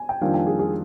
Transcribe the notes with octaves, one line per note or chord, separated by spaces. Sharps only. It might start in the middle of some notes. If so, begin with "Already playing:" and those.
Already playing: G#5
G5
F2 D#3 G3 A#3 D4 F5
G5
G#4
G#4